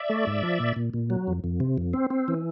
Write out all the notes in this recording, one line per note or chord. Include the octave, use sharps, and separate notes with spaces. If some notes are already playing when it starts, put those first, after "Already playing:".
Already playing: D5 E5
A3
G#2
F3
A#2
A#2
A#2
F#3
F2
F2
C3
F2
C4
C4
E3